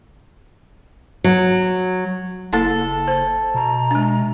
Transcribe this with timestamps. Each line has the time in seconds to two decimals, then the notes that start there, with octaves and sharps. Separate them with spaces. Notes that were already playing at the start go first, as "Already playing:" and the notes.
1.24 F#3
2.53 F#1 A#3 E4 A4 A5
3.08 C5
3.55 B2 A#5
3.91 G#3 D4